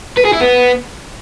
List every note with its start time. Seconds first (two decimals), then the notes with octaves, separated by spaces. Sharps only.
0.17 B4
0.25 G#4
0.33 E4
0.41 B3